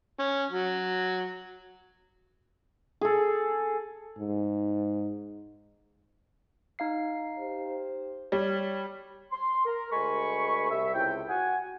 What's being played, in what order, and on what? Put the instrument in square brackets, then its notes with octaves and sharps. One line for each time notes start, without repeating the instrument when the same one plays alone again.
[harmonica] C#4
F#3
[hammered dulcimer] G#4 A4
[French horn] G#2
[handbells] D#4 F5 C7
[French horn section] G4 C5
[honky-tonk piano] G3 [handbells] C#5
[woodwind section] C6
A#4
D2 G#3 A#4 G#5 B5 C#6
C2 E5
C#2 C3 E4 G5
F#4 F#5 G#5